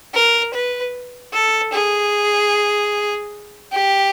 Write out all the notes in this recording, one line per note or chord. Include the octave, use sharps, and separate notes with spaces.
A#4
B4
A4
G#4
G4